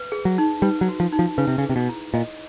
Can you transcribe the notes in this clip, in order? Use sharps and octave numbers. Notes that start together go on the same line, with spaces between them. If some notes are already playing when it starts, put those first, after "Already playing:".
Already playing: B4
G#4
F#3
D#4
G3 B4
F#3
F#4
F3
D#4
F3
C#3 B4
C3
C#3
G#4
C3
B2
E4
A#2 D#5